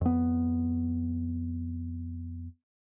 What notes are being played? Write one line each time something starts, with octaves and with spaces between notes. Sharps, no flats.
F2 B3